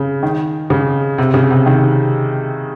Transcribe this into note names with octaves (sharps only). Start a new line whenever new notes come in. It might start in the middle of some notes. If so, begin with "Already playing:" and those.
Already playing: C#3
D#3
C#3
C3
C#3
C3
D#3